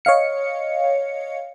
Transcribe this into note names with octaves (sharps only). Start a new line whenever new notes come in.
C#5 D#5 F5 C#7